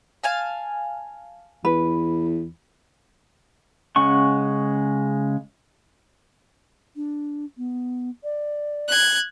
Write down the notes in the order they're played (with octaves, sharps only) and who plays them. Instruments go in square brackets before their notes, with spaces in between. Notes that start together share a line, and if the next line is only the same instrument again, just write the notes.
[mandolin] F5 G#5 A5
[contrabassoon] E2 [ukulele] B4
[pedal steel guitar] C#3 G#3 C#4 F#5 C#6
[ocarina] D4
B3
D5
[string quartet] F#6 G#6